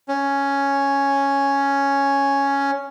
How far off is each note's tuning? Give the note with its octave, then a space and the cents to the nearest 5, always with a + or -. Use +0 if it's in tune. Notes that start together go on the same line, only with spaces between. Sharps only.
C#4 +0